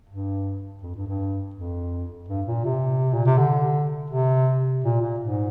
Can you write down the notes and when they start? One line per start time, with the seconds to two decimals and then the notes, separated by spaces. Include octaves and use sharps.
0.10 G2
0.82 F2
0.95 G2
1.07 G2
1.56 F2
2.29 G2
2.47 A#2
2.65 C3
3.13 A#2
3.26 C3
3.38 D3
4.11 C3
4.84 A#2
5.02 A#2
5.20 G#2